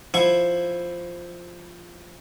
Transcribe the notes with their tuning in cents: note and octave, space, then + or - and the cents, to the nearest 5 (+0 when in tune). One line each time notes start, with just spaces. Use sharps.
F3 +0 E4 +5 C#6 +0